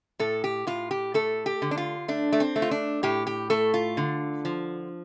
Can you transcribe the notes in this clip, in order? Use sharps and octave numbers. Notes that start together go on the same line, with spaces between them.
A2 A4
G4
A2 F4
G4
A3 A4
G4
D3
D4
F4
A3 D4
A3
C4
A3
F4
D4
A2 G4
G4
A3 A4
F4
D3
F3